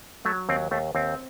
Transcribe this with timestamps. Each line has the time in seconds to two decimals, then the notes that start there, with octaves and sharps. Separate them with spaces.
0.25 F#3 A3
0.49 D#2 C4
0.71 D#2 A3
0.95 D#2 C4